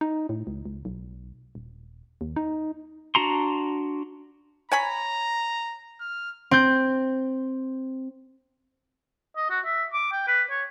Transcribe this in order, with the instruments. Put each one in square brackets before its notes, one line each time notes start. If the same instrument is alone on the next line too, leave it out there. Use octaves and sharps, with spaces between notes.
[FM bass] D#4
A2
C#2
C#2
B1
D#1
D#2
D#4
[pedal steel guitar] D4 F#4 A#5 C6
[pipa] C#5 G#5 B5 [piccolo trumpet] A#5
[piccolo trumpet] F6
[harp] C4 G6
[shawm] D#5
F#4
E5
D6
G5
B4
C#5